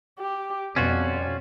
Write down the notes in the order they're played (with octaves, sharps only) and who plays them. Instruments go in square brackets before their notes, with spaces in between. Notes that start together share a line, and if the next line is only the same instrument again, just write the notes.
[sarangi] G4
[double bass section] F2 [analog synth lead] B2 [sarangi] G3 [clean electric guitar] C#4 F4 F#4